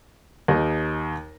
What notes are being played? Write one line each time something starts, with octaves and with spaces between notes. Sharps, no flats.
D#2 D#4 D#5